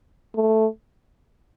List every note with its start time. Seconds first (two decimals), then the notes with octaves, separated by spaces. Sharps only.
0.35 A3